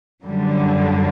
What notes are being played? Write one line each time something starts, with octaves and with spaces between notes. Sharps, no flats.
F#2 D3 G3